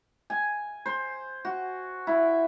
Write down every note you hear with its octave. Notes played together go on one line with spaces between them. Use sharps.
G#5
C5
F#4
E4